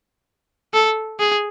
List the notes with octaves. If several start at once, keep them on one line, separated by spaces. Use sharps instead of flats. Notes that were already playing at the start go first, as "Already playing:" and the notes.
A4
G#4